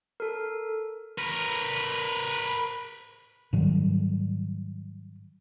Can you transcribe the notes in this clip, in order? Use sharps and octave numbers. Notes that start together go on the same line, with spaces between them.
A4 A#4
A#4 B4
G#2 D#3 F#3 G3